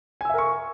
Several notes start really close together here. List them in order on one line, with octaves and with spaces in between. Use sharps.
G#5 E6 E5 A#4 C#6